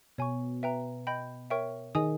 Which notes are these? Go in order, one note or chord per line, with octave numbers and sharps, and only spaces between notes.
B2 C#5 G#5 C#6
B4 E5 G5 A#5
D#5 G5 B5 G6
A#4 C#5 E5 G5 C#6
D#3 G#4 D#5 G#5 D#6